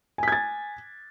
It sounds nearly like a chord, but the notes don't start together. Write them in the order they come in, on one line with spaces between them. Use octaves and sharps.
G#5 B6 G#6 A6